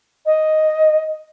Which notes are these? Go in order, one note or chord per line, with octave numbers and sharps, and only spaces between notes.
D#5